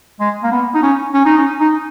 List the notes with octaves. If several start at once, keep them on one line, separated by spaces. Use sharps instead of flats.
G#3
A#3
B3
D#4
C#4
C#4
D#4
C#4
D#4